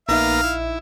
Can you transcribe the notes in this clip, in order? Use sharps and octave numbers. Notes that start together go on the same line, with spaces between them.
A#1 A#3 B3 D#4 E5 F5 A#5
E4